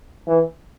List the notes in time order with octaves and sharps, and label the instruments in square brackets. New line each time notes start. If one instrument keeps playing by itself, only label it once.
[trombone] E3